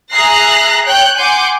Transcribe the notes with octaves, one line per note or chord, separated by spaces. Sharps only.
G#4 E5 A#5 F#6 A#6 C7
C#5 G5 F#6 G6
F#5 G#5 C6 D6 G6